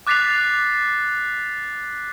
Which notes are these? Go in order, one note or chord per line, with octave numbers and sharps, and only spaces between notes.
D6 F#6 A6 B6 C7 F7